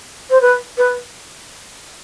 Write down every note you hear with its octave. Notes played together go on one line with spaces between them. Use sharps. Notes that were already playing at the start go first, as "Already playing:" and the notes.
C5
B4
B4